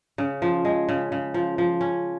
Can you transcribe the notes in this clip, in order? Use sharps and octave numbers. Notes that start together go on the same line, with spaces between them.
C#3
F3
G#3
C#3
C#3
F3
F3
C#4